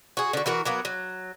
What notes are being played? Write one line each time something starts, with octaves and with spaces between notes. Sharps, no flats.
F#4 G#4
D3 F#4
E3 F#4 A#4
F#3 A#3 B3
F#3